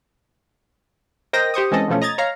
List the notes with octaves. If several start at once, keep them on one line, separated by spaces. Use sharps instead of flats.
A#4 C5 D#5 G5 D#6 A#6
G4 C5 C#6 D#6
E3 G#3 C4 C#4 A4 D#5
E2 B2 F3 A3 C#4
D#5 A#5 G#6 A6
C#5 F5 A#5